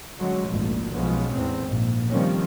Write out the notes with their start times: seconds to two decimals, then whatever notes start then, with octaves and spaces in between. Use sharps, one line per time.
0.18 D3 F#3 G#3 C#4
0.48 G#1 D2 A#2 F3
0.92 B1 F3 G#3 B3 C#4
1.34 E2 A2 C4
1.66 A#1 G#2
2.10 D#3 F3 G3 A3 C4 C#4